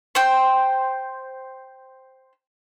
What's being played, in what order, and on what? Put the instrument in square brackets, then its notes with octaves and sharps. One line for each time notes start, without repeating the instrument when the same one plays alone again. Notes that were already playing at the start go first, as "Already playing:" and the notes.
[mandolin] C5 G5